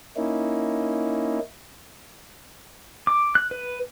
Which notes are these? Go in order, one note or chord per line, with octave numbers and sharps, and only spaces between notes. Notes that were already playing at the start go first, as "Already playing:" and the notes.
A#3 C#4 D#4 E4
D6
F#6
B4